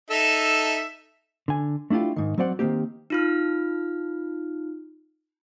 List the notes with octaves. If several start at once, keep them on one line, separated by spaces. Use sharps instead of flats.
D#4 A4 E5
D3 G#5
A3 D4 E4 F4 G4
G#2 D#3
F#3 C4 C5 D5 F#5
D#3 F#3 A#3 C4 G4
D#4 F4 F6